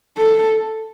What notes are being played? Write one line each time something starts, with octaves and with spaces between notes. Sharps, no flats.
A4